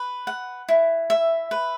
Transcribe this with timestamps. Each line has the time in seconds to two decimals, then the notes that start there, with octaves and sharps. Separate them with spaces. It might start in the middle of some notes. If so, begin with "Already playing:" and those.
Already playing: B4
0.27 F#5
0.69 E4
1.10 E5
1.51 B4